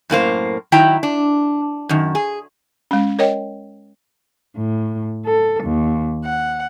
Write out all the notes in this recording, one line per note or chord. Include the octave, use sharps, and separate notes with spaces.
F#2 A2 A#3 C5
D#3 F#3 E4 G5 A#5
D4
F#2 D#3
G#4
G#3 C#4
A#4 C#5 D#5 G5
A2
A4
D#2
F#5